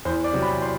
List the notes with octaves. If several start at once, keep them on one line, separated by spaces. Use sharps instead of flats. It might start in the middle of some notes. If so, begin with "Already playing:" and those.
E2 C5
D5
C3 F#3
B5
C6